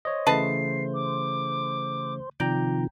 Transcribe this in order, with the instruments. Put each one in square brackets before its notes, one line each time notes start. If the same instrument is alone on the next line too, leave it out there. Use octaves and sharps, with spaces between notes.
[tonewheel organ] C5 [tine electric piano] C#5 D#5
[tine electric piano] C#3 E3 A3 [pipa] B4 D#5 A5 [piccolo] C7
[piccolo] D6
[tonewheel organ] C3 D#3 F3 [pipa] D5 [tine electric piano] G5 A#5 G6